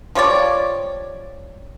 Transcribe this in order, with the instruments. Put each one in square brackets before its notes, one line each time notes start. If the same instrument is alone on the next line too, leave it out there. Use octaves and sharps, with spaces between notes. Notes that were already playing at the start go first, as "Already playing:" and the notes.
[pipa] F3 G3 C#5 D5